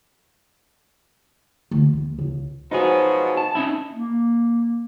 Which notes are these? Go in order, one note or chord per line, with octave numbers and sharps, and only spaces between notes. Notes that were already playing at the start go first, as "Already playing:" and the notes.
D2
D#2
C#2
B2 F3 F#3 D#4 G#4
A5
C#4 D#4 E4
A#3